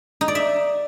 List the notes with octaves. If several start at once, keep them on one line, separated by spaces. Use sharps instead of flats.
D#4
D5
E5